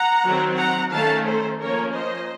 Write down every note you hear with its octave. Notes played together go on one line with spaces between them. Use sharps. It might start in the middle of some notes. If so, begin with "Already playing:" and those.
Already playing: F#5 A#5
D#3 F#3 C4
F#5 A#5
D#3 A3 C#4 F5 A5
A4 C5
F3 A#3 C#4 A#4 C#5
C5 D#5